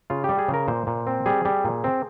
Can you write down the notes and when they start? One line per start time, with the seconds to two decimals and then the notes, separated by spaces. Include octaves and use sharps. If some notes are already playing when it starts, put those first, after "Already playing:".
0.10 C#3 F4
0.24 G4
0.29 G3
0.39 G#4
0.48 C#3
0.54 A#4
0.68 A#2 C5
0.87 A#2
1.07 C4
1.26 G3 G#4
1.45 G3
1.64 A#2
1.84 C4